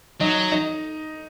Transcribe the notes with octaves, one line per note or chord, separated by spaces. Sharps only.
F#3 D#4
D#4